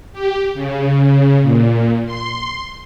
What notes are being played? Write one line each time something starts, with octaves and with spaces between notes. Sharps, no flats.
G4
C#3
C#3
A#2
C6